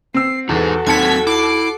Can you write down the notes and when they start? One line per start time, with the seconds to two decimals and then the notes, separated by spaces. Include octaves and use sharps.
0.14 C4 E6 C7
0.49 E2 E3 D#4 F#4 G#4 A4
0.87 D#2 F#3 C4 F#5 A5 G#6 B6 C#7
1.27 E4 D6 C7